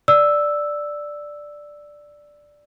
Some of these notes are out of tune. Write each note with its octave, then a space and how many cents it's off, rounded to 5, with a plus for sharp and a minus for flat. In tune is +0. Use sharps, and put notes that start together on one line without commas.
D5 +0 E6 +0